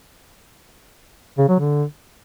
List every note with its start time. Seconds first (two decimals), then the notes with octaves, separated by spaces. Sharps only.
1.38 C#3
1.49 F#3
1.59 D3